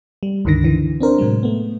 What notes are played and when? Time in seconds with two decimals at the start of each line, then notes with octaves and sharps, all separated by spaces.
0.23 G3
0.45 C#2 G2 D3 D#3 A#6
0.64 D3 E3
1.00 C4 D4 A#4 C5
1.18 A2 C3 F#3 G#3
1.43 A3 B3